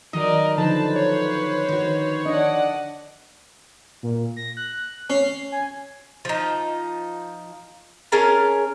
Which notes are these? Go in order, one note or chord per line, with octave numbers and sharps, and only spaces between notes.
D#3 F#3 A#4 D5 D#5
D3 F3 D#4 B4 C5 A5
C#5
D#3 F#4
D4 D5 D#5 F#5
A#2
A#6
F#6
C#4 C7
G#5
F3 D#4
C#4 G#4 A#4 A5